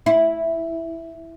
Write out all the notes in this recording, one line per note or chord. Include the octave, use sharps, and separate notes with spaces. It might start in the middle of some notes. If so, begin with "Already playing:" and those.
E4